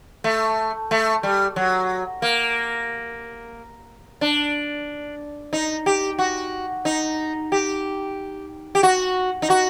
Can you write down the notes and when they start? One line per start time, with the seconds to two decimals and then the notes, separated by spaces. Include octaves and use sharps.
0.24 A3
0.91 A3
1.23 G3
1.56 F#3
2.22 A#3
4.21 D4
5.53 D#4
5.86 G4
6.19 F#4
6.85 D#4
7.52 G4
8.75 G4
8.83 F#4
9.42 D#4
9.50 F#4